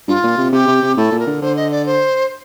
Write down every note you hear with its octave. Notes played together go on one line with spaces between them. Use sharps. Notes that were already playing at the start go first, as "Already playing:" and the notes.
G2 F4
A#2
C3
C3 G4
C3
C3
A2 A4
A#2
A#4
D3
D3 C5
D#5
D5
C5